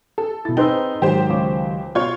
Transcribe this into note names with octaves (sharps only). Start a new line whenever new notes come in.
A4
B2 E4 A6
C4 D#4 G#4 B4 G5 C6 E6
G#2 D#3 F#3 G4 C5
C#2 C#5 D6
B2 F4 C#5